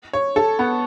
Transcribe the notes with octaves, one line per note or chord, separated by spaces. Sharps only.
C#5
A4
B3